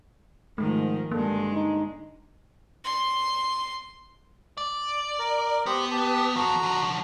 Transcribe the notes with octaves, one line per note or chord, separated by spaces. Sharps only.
G#2 D#3 F3 A3
G2 D3 G#3 A#3 A4
D#4
C6
D5
A#4
B3 G4 C5
G4 A5
F3 F#4 A4 A#5
D3 F3